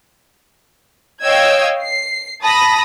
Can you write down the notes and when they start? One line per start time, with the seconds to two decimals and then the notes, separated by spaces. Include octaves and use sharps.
1.23 C#5 D#5 F5 G5 E6 G#6
1.83 C7
2.44 A5 B5 D#6 A#6